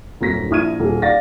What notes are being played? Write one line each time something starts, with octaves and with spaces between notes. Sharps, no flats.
D#1 F#2 A#6 B6
A#1 E4 D#6 F6 G#6 D#7
D#1 G#4
D5 F5 A6 A#6